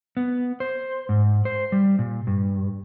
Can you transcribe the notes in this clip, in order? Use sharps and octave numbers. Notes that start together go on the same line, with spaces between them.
B3
C5
G#2
C5
G3
A#2
G2